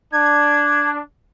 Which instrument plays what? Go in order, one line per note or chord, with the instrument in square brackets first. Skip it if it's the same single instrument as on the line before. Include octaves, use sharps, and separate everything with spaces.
[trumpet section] D4 [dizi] G#6